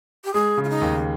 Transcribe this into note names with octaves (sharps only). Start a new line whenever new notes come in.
G4
G#3 G#4
C#3
F4
D#4
D#2